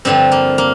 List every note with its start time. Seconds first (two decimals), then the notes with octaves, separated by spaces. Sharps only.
0.05 G2 D3 F3 C4
0.32 A#3
0.58 A#3